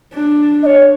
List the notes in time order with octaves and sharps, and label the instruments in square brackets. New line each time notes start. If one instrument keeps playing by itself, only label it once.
[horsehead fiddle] D4
[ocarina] D#5
C#5